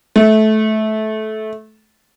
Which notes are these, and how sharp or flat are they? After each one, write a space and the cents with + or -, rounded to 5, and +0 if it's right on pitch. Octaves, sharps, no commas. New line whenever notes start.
A3 -20